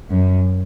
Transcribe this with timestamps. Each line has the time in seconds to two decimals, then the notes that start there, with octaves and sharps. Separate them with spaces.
0.13 F#2